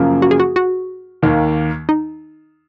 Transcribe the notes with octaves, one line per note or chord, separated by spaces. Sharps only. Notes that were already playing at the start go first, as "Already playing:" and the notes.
Already playing: F#2 C#3 F3 A#3
F#4
G#4
F#4
F#4
D#2 D#3 A#3
D#4